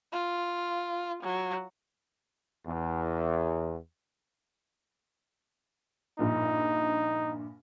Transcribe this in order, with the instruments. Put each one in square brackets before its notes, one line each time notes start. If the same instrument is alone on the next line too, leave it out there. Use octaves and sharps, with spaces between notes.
[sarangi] F4
F#3
[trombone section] E2
[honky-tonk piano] A#1 G2 A#2 [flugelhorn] D#4